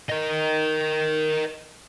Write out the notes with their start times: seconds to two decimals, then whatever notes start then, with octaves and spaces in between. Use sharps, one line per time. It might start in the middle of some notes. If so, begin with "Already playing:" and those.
0.09 A#4 D#5